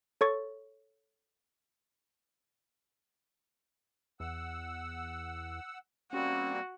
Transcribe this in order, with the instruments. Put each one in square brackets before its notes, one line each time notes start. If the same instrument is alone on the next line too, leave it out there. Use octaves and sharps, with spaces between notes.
[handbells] A4 C#5 C#6 A6
[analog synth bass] E2 [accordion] F#5 E6
[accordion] G3 A#3 C4 [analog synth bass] C#4 [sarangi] F#4